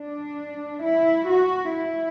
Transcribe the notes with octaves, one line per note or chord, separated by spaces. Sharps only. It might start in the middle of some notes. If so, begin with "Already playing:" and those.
Already playing: D4
E4
F#4
E4